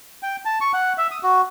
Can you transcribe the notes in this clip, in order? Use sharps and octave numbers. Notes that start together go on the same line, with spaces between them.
G5
A5
C#6
F#5
E5
D#6
F#4